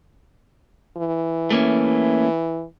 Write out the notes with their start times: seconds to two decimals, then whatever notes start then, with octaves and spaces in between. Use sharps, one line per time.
0.97 E3
1.50 A3 A#3 C#4